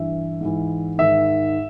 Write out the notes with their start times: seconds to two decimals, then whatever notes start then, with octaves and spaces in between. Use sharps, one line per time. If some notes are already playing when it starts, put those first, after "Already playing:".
Already playing: G2 E3 E5
0.41 G#2 E3
0.98 G#2 D#3 E5